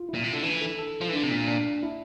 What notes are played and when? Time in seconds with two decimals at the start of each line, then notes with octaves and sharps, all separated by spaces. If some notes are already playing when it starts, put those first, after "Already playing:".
Already playing: F4
0.09 E4
0.14 A#2
0.24 C3
0.33 D3
0.43 E3 D4
0.61 A4
0.79 A4
1.01 F3
1.09 E3
1.13 D3 D4
1.23 C3
1.31 A#2
1.48 D4
1.83 E4